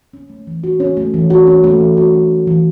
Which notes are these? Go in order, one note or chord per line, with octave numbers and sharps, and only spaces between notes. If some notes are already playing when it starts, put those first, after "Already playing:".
C#4
A3
E3
F#4
C#4
A3
E3
F#4
C#4
A3
E3
F#4
C#4
A3
E3